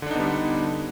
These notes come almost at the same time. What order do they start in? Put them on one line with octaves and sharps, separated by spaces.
D3 D4 D#4 B3 G3